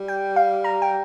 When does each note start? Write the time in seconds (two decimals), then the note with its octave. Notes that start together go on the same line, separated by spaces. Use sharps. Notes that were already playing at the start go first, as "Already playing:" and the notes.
Already playing: G3
0.08 G5
0.36 F5
0.64 A#5
0.82 G5